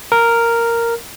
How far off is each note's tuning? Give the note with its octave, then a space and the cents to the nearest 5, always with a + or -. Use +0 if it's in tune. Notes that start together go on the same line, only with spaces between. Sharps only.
A#4 -5